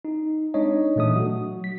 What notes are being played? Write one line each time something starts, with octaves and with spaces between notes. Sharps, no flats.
D#4
G#3 C4 D4 D#4 C#5 D#5
A#2 E3 A3 D4 D#6
F#3 F#4
B6